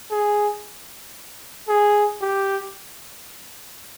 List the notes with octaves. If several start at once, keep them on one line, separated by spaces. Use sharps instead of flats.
G#4
G#4
G4